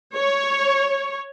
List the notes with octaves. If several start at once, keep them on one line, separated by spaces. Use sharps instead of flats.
C#5